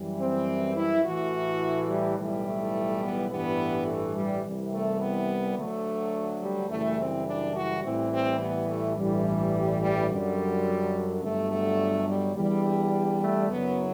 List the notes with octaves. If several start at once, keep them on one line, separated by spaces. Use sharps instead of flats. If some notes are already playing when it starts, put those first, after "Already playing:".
Already playing: F#2 E3 G3
C4
E4
A1 A2 E3 F#4
G3
B1 A2 E3 G3
A3
B3
A1 G2 E3 G3 B3
A3
G3
C2 C3 E3 G3
A3
B3
D2 D3 F#3 A3
G3
F#1 F#2 E3 G3 A3
C4
D4
F#4
A1 A2 E3 G3 C4
C4
B3
A3
A1 G2 E3 G3
G3
F#2 D3 F#3 G3
G1 G2 D3 F#3 A3
A3
G3
E2 D3 G3
A3
F#1 F#2 F#3 B3